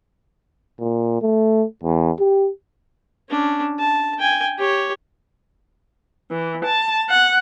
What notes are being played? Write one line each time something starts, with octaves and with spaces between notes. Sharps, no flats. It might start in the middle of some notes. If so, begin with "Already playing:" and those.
A#2
A3
E2
G4
C#4 D4
A5
G5 G#5
G4 C#5
E3
A5
F#5